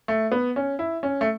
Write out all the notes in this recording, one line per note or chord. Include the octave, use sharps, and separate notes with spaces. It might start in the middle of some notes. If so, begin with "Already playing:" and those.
A3
B3
C#4
E4
C#4
A3